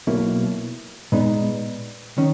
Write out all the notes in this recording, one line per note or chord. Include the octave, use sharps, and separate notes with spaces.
B1 B2 A#3 E4
A#2 G#3 B3 D#4
D#3 C#4